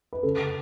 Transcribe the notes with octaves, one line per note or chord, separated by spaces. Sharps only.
B4
C#3 A4